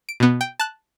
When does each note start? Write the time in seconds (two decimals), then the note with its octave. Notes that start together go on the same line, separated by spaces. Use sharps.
0.09 D7
0.20 B2 B3
0.41 G5
0.60 A5 F#6